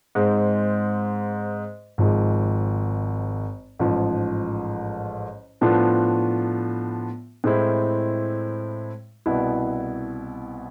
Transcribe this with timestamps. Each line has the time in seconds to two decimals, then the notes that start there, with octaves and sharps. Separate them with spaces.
0.15 G#2 G#3 C4
1.98 G#1 G#2 F3 G#3
3.79 A1 G#2 F3
5.61 A2 F3 B3 D4 F4
7.44 A2 G#3 C4 E4
9.26 C2 B2 B3 E4